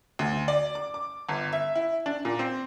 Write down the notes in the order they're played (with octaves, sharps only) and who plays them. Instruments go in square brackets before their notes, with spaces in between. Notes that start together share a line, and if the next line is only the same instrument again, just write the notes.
[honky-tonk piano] D2
D5
D6
D6
G1
E5
E4
D4
A#2
C4